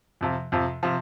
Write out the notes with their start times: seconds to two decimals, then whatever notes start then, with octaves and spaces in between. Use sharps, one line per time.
0.21 F2 C3 F3
0.52 F2 C3 F3
0.83 C3 F3